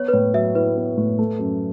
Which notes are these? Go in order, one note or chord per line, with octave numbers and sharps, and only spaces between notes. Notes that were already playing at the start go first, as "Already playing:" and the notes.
Already playing: B3 C#5
B4
A2 C#5
F#3 E5
E4 B4
B3
A2
A3
F#2